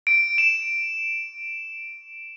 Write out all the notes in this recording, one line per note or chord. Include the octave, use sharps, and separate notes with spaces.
D7
E7